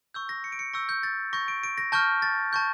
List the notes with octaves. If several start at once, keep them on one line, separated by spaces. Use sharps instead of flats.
C#6 E6 G6
A#6
C#7
D7
C#7
C#6 E6 G6 A#6
G6
A6
C#6 G6 A#6
D7
D7
A#6
A5 C#6 F6 G6
A6
A5 C#6 G6